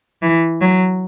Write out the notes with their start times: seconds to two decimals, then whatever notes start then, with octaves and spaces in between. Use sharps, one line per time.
0.22 E3
0.61 F#3